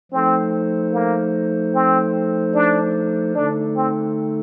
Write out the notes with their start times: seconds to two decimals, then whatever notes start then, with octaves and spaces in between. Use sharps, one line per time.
0.11 F3 A3 C4 D#4 A4 C5
0.92 A#3
1.74 C4
2.54 D4
3.35 D3 A3 D4 D#4 A4
3.76 C4